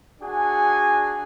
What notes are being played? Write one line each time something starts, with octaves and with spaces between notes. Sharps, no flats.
D4 F#4 G#4 G#5